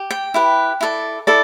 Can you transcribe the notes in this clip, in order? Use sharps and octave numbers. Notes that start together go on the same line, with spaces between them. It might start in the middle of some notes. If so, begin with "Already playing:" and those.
Already playing: G4
G5
E4 G4 B4
E4 A4 D5
E4 A4 D5